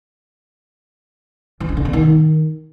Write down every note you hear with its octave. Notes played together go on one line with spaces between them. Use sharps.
E3
D4
D3
B3
D#3